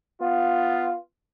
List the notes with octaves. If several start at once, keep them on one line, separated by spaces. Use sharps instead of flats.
B3 F4